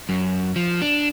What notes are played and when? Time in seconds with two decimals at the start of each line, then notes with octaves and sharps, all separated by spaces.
0.09 F#2
0.56 F3
0.82 D4